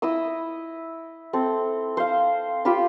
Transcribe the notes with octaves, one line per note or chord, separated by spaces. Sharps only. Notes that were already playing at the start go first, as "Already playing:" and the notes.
E4 D#5 D#6 E6
C4 A4
C5 F5
F4 G4 C5 B5